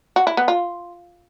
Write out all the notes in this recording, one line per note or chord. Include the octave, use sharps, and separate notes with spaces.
F#4
E4
B3
F4